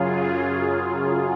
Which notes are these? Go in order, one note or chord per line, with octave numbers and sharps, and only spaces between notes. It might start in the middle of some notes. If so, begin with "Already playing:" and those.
Already playing: F#2 C#3 F#3 F4 G#4